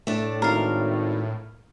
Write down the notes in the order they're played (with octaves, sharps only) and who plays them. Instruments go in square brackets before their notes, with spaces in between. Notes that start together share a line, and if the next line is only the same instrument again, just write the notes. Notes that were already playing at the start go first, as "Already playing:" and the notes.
[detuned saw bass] A2 [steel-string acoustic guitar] A3 D4
[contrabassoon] G#1 [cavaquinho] A#4 F5